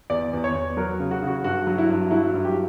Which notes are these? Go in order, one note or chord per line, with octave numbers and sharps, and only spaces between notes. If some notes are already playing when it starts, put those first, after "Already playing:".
E2 D5
E2
C#5
E2
F#3 A#4
C#3
F#4
C#3
F#4
G2 F#4
F#3
E4
G2
F#3 E4
G2
G4